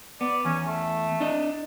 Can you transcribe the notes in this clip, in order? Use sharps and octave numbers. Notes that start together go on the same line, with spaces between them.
B3 D5
E2 C#4
A3
D4 D#5